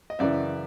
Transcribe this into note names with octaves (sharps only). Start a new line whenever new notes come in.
D#5
F#2 C#3 E3 D5 E5